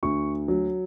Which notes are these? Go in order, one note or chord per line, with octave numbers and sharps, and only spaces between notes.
D2 C#6
F#3